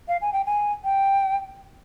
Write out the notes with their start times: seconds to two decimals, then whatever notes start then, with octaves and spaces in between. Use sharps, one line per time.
0.08 F5
0.21 G#5
0.33 G5
0.46 G#5
0.84 G5